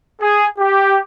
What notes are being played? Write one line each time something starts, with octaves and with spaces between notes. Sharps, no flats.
G#4
G4